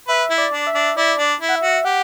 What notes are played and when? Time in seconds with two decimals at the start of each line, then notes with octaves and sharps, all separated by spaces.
0.08 B4 E5
0.30 E4
0.38 D5
0.52 D4
0.67 E5
0.75 D4
0.97 E4 D5
1.18 D4
1.41 E4
1.48 F#5
1.55 E5
1.63 F#4
1.85 G4 F#5